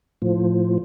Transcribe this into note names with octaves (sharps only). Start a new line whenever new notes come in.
A2 F3